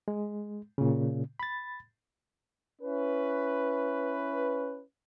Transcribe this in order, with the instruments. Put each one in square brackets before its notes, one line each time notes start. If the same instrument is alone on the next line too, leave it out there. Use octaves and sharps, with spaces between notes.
[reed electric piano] G#3
A#2 C#3
B5 A6
[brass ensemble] C#4 E4 B4